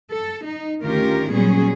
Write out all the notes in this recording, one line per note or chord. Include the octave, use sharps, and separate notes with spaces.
A4
D#4
D2 D#3 C#4 F4 G4 A#4
A#2 F#3 G3 B3 C#4 G#4